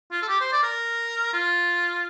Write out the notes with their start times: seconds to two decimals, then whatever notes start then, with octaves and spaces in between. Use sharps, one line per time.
0.11 F4
0.22 A4
0.28 G4
0.41 C5
0.52 D5
0.63 A#4
1.33 F4